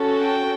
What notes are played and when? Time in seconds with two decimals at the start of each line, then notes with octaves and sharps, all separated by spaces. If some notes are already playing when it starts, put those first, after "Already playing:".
Already playing: C#4 F#4 A4
0.20 G5